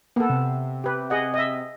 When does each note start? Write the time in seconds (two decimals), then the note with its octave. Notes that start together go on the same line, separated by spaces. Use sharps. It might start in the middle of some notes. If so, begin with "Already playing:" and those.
0.16 A#3 B3 A4
0.29 C3
0.84 G4 B4
1.10 G#4 D#5 F#5
1.34 D#5 E5